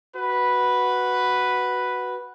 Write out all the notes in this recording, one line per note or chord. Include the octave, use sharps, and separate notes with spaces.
F#4 B4